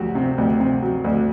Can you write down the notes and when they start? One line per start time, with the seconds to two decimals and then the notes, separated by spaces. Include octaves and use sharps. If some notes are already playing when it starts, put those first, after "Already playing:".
Already playing: D2 F#3 F#4 G4
0.15 C3
0.38 D2
0.60 C3
0.82 F#3
1.04 D2